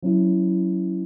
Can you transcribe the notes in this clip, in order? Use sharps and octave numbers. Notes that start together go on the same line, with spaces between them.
F#3 C#4 E4